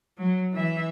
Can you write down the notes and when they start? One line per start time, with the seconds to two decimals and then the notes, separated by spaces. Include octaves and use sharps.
0.18 F#3
0.53 E3 E5